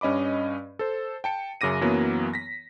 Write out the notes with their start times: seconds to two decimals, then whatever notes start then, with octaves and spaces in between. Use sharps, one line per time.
0.01 G2 C#4 D#5 B5 D6
0.79 A4 C5
1.24 G5 A5 C#7
1.61 F#2 C#3 D6 A#6 D#7
1.81 F#2 E3 F#3 A#3 B3
2.34 A#6 B6